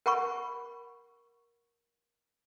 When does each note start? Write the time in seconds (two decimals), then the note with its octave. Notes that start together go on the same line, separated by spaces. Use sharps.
0.06 A#4 F#5 B5 C#6